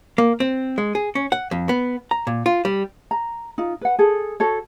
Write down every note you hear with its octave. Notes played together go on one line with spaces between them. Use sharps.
A#3
C4
G#3
G#4
C#4
F#5
F2
B3
A#5
A#2
F4
G3
A#5
D#4 F4
B4 F#5
G#4 A4
F#4 A4 C#5